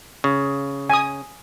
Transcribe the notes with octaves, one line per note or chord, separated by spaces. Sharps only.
C#3
G#5 D#6